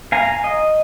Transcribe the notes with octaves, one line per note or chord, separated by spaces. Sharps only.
F5 G#5 A#5
D#5